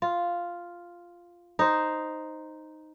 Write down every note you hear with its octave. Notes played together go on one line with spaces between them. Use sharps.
F4
D#4 C5